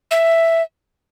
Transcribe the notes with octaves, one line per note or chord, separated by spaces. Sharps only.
E5